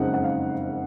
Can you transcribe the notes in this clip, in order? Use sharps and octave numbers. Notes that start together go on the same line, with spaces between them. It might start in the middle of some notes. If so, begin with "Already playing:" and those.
Already playing: F#1 F2 C#3 G#3 D#4 F#5
F#5
F5